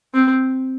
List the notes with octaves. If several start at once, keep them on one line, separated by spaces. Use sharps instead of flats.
C4